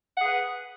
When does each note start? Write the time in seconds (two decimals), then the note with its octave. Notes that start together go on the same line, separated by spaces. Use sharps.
0.17 F#5
0.21 G#4
0.25 B4